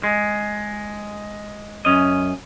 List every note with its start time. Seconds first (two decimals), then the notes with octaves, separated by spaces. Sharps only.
0.03 G#3
1.85 F#2 C#4 D#5